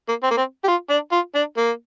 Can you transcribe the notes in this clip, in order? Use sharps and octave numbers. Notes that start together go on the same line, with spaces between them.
A#3
C4
A#3
C4
G4
F4
D4
F4
D4
A#3